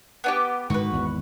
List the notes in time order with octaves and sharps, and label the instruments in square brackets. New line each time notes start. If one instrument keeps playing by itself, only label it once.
[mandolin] B3 D4 G4
[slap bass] G#2 D3 D#3 [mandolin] F#4 B4
[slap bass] G#1 E2